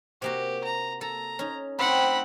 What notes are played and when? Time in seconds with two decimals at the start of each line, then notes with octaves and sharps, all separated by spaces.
0.22 C3 A#3 F#4 G4
0.64 A#5
1.01 A4 A#5
1.39 C#4 D#4
1.79 F#3 A3 C4 D#4 G4 C5 F#5 B5